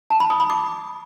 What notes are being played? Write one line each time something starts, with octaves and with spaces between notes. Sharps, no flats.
A5
B5
D#6
B5
D6